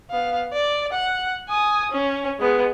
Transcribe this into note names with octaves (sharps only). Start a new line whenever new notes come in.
B3 F5
D5
F#5
G#5 D#6
C#4
G#3 B3